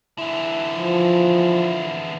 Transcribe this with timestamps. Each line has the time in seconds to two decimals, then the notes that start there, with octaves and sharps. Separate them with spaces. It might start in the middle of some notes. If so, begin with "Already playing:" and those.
0.18 D3 E3 E4
0.76 F3